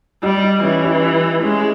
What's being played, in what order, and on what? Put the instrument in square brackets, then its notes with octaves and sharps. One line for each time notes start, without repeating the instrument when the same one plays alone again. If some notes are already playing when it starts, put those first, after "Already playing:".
[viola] G3 [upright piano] D#4 G4
[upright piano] D#4
[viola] E3 [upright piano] C#4 E4
[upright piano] D#4 G4
[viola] G#3 [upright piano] C#4 E4